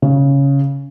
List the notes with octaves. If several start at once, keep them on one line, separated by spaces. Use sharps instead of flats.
C#3